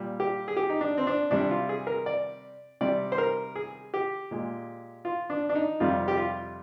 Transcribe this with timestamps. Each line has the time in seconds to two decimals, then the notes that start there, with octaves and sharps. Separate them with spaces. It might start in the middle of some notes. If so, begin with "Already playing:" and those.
Already playing: A#2 G3
0.20 G4
0.48 G#4
0.57 G4
0.69 D#4
0.81 D4
0.98 C4
1.07 D4
1.31 C3 G3 D4
1.51 F4
1.69 G#4
1.87 A#4
2.06 D5
2.81 C3 G3 D5
3.12 C5
3.18 A#4
3.56 G#4
3.94 G4
4.31 A#2 G#3
5.05 F4
5.30 D4
5.49 D4
5.55 D#4
5.80 F2 C3 G3 F4
6.08 G4
6.17 F4